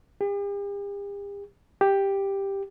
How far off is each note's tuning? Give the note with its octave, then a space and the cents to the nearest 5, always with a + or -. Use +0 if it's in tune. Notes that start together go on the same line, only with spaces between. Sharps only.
G4 +45
G4 +5